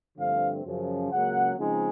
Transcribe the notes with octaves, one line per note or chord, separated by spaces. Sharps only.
G2 D3 F3 A3 C4 F5
F#2 C#3 F3
C#2 C#3 F#3 A#3 F#5
C#3 F3 G#3 C4 D#4